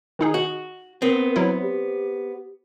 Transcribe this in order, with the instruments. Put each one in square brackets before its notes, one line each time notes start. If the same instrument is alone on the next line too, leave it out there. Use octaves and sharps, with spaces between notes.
[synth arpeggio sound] D#3 D#4 G#4
[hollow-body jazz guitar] F#4
[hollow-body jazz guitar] B3 C4 [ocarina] A#4
[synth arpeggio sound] F#3 E4 [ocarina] B4
[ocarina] G4